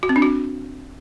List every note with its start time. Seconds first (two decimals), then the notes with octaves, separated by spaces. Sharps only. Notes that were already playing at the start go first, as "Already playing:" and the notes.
0.03 F#4
0.09 C4
0.16 D4
0.22 F#4